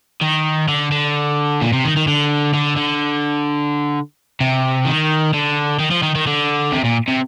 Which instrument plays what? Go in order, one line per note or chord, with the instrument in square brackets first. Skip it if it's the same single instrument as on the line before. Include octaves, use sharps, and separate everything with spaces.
[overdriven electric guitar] D#3
D3
D3
A#2
C3
D#3
D#3
D3
D3
D3
C3
D#3
D3
D#3
F3
D#3
D#3
D3
C3
A#2
C3